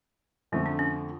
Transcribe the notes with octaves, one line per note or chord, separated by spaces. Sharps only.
F2 D3 F3 A3 C#4
D4
C#4